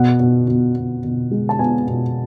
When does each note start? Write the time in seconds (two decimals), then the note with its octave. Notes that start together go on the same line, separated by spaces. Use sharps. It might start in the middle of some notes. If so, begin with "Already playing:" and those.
Already playing: B2 F#5
0.20 B2
0.48 B2
0.76 B2
1.04 B2
1.31 G#3
1.49 A5
1.59 B3 G#5
1.87 B2